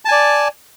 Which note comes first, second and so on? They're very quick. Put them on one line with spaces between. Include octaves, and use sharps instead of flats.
A5 G#5 D5